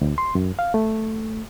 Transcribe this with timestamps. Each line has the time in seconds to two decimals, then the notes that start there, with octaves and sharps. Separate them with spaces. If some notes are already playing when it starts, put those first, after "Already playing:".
0.01 D2
0.18 C6
0.35 F#2
0.59 F5
0.74 A3